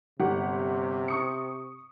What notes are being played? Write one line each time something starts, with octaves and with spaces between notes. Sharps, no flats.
G1 C3 G4 F#5
C#6 D#6 C#7